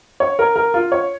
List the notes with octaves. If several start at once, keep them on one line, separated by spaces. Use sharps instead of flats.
C#5
A#4
A#4
F4
C#5